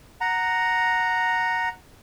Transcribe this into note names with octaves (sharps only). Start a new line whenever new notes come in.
F#5 A#5